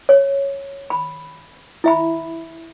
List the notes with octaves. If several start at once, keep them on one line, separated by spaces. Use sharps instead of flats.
C#5
B5
E4 E5 B5